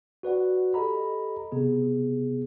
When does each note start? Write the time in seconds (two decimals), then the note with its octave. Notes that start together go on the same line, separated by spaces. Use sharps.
0.23 F#4 B4 D5 F#5
0.74 G4 A4 D#5 A#5 B5
1.52 C3 B3 G#4